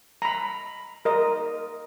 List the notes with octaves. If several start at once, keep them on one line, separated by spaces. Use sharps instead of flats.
A#5 B5
A#4 D#5